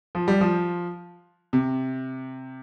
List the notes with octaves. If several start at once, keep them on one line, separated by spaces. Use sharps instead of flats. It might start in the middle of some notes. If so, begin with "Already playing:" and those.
F3
G3
F3
C3